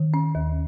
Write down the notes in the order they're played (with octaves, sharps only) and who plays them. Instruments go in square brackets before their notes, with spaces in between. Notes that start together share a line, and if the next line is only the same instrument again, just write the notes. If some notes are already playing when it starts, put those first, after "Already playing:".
Already playing: [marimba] D#3
C#4
D#2